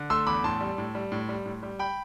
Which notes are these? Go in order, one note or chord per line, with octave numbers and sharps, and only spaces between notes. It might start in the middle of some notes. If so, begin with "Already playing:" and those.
Already playing: D3
A3 C6 E6
E2 B5 D6
A2 A5 C6
G3
A2
G3
A2
G3
A2
G3
G5 B5